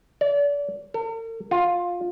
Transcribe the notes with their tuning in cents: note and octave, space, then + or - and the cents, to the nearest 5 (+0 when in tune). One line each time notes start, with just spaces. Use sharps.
D5 -35
A#4 -45
F4 +15